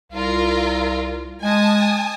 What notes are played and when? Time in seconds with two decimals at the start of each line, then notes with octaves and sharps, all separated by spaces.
0.12 C2 F4 A#4 A#5
1.42 G#3 G#5 A5 D#6